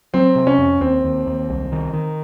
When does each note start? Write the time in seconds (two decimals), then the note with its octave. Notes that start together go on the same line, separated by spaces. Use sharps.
0.14 F#3 C4
0.36 C3
0.47 C#4
0.58 F2
0.81 D#2 C4
1.04 D#2
1.27 D#2
1.50 C2
1.72 D#3
1.93 D#3